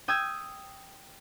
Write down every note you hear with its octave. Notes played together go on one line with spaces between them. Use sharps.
G5 D#6 E6 G6 G#6